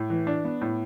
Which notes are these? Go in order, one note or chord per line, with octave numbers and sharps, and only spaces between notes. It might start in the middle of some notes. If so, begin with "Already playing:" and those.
Already playing: A2
E3
D4
B3
A2